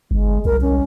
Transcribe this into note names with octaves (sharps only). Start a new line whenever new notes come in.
G1 G#3
C2 A#4
C#4